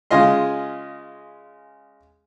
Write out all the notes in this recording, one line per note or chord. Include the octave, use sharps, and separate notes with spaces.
C#3 G#3 F4 D#5 C6